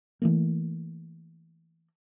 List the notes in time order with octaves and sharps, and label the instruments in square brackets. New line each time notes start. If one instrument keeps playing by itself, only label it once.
[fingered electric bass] E3 A3 A#3